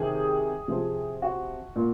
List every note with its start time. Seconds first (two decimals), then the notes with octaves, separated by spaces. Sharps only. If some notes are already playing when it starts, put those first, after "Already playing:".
Already playing: C3 D#3 G#4
0.68 C3 F3
1.22 F#4
1.76 A#2